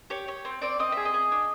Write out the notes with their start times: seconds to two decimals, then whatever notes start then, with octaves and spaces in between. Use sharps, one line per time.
0.10 G4 C#5
0.28 G4 C#5
0.45 C4
0.62 C4 D5
0.79 C4 D#5
0.92 G#4 E5
1.05 D#5
1.14 G#4
1.32 D4